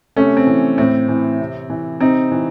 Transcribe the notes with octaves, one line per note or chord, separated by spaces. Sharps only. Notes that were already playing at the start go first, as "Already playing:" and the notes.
C3 A3 C#4
C4
E3
A2 C4
E3
C3
E3
C3 C4 D#4
E3